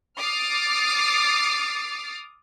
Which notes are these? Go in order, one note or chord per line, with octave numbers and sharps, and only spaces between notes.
D6 D#6 F6 A6 C7